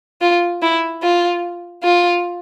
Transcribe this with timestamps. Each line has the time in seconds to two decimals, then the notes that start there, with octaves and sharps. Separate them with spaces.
0.22 F4
0.62 E4
1.03 F4
1.83 F4